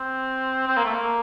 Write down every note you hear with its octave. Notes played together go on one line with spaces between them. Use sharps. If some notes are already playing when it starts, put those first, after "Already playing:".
Already playing: C4
C4
A#3
A3
A#3